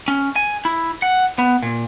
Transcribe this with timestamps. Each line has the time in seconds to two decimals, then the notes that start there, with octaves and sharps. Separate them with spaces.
0.08 C#4
0.36 G#5
0.65 E4
1.02 F#5
1.39 B3
1.62 A#2